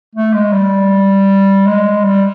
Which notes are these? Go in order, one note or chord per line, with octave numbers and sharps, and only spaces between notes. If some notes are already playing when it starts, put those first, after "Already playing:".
A3
G#3
G3
G#3
G3